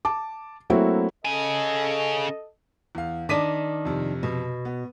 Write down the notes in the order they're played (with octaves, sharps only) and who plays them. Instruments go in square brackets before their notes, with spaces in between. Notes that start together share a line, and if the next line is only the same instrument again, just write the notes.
[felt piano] A5 D6
F#3 A3 A#3 C4 E4 F#4
[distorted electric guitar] C#3 G#5 [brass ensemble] A4 D#5
[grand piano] E2 F5
[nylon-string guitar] D#3 D4 [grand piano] D6 B6 D#7
[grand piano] F2 C3
[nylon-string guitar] B2
[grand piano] B3